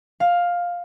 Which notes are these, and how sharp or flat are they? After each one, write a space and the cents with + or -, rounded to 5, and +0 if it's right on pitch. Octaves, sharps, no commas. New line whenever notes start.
F5 +10